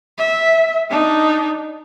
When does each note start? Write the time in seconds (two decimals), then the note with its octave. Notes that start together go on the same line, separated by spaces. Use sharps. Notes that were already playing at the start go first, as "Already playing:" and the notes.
0.18 E5
0.90 D4 D#4